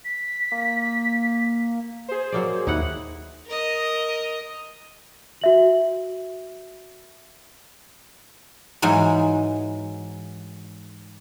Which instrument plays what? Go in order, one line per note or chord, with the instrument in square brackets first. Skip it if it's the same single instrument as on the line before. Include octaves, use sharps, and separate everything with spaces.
[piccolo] B6
[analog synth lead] A#3
[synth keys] G#4 C5
[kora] F#3 A#3 D5
[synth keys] D#2 [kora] D#4 E4 F#5
[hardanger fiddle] A#4 D#5
[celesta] F#4 E5 F#7
[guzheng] G#2 E3 F#3 G#3